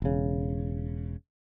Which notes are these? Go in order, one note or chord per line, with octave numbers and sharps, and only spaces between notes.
E1 C#3